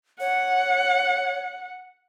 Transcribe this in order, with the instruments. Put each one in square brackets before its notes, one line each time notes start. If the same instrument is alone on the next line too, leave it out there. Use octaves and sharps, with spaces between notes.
[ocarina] C#5 [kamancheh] F#5